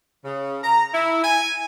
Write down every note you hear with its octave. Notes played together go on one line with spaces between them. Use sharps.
C#3
A#5
E4
G#5